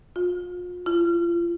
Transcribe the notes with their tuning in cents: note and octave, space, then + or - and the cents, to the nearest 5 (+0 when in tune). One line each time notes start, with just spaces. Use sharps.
F4 +40
F4 -30